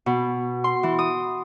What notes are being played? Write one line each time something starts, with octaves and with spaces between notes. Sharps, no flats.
B2
C6
E3
D#6